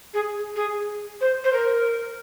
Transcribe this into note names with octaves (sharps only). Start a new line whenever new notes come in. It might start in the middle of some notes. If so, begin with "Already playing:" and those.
G#4
G#4
C5
C5
A#4